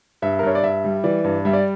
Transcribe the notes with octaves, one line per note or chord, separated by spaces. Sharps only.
G2 E5
A#4
G2 C#5
D5
G2 E5
G3
E3 D5
G2
G3 E5
D5